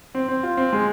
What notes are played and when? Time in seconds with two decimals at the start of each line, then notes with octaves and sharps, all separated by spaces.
0.15 C4
0.28 C4
0.43 F4
0.57 C4
0.73 G#3